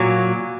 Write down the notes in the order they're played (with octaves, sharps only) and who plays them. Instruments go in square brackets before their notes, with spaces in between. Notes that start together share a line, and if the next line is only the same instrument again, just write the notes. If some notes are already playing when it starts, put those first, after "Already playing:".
Already playing: [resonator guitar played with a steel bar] A#2 F#3